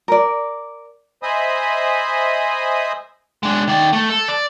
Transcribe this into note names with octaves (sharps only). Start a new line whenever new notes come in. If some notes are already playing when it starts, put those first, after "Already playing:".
A#4 D5
C5 D#5 E5 G#5 B5 D#6
G#3 D4
D#3 D5
A3
A4
D5